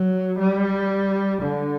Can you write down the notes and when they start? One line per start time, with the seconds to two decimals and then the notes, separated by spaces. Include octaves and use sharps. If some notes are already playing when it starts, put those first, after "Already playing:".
Already playing: F#3
0.39 G3
1.42 D3